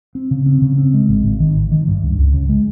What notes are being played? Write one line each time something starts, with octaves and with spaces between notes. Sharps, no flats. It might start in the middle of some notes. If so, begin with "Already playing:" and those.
C4
C#3
C4
C#3
C4
G#3
G#1
G#1
D#3
G#1
D#3
G2
C#2
C#2
C#3
G#3